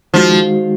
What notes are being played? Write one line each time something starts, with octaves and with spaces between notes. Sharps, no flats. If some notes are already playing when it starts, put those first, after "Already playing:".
D#3 F3 G#3 D#4 F#4